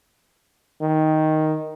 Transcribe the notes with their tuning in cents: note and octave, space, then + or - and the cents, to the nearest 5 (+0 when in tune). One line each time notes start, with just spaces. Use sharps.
D#3 +5